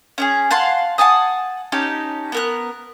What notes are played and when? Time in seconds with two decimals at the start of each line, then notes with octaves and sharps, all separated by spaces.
0.18 C#4 D4 G#4
0.51 F5 F#5 A5 C6
0.98 F#5 G#5 A5 D#6
1.72 C#4 D#4 G4 A5
2.32 B3 A#4 F#6